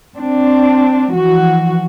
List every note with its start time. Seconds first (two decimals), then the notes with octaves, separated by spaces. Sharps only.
0.16 C4 D4
1.11 E3 F3 F#4